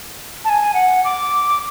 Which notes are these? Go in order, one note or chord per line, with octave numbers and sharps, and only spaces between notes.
A5
G#5
F#5
D6